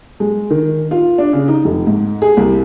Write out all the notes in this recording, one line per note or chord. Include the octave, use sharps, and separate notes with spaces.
G#3
D#3
F4
D4
C#3
D#4
F1
G#2
G#4
C2